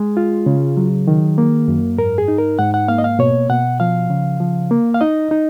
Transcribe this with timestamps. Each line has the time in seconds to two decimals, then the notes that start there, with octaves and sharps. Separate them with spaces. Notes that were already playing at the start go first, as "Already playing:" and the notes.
Already playing: G#3 G#4
0.17 F4
0.46 C#3
0.77 F#3
1.08 D#3
1.38 A#3
1.68 F#2
1.98 G#2 A#4
2.18 G#4
2.28 D#4
2.38 A#4
2.59 G#2 F#5
2.74 F#5
2.88 A#3 F5
2.98 D#5
3.04 F5
3.19 B2 C#5
3.50 B2 F#5
3.80 F3 F5
4.10 C#3
4.40 F3
4.71 A#3
4.94 F5
5.01 D#4 D#5
5.31 D#4